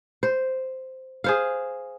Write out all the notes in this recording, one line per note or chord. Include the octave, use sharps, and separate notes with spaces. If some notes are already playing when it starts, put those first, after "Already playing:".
C5
G#4 C5 F5